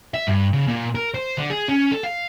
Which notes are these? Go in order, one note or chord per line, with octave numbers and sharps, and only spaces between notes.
E5
G2
C#3
A#2
A#4
C5
D3
G#4
C#4
A4
F5